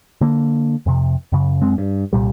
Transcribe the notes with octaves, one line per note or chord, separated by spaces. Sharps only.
D3 A#3
F2 C3
F#2 C#3
F#2 G#3 C4
G2
C2 A#2 G3